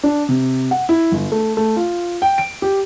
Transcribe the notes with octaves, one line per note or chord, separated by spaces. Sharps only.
D4
C3
F#5
E4
G1
A3
A3
F4
G5
D7
G4